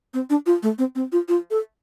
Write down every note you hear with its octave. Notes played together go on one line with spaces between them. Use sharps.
C4
D4
F4
A3
C4
C4
F4
F4
A4